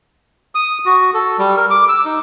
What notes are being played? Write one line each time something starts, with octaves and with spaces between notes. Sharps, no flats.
D#6
F#4
A4
G3
A#4
D6
E6
D#4